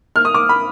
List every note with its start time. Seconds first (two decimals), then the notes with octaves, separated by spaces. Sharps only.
0.16 F6
0.25 D#6
0.34 D6
0.49 B5